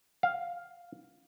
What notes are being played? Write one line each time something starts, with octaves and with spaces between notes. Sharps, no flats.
F5